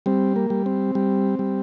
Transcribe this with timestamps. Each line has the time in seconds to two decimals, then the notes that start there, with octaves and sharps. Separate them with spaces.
0.06 G3 C4
0.36 A#3
0.50 G3
0.66 C4
0.95 G3
1.39 G3